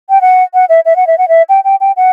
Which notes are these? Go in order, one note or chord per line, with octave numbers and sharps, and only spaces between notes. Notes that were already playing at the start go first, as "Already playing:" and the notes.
G5
F#5
F#5
E5
E5
F#5
E5
F#5
E5
G5
G5
G5
F#5